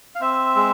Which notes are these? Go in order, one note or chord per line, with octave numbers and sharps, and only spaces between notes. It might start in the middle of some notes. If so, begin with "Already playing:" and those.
F5
C4 E5
G#3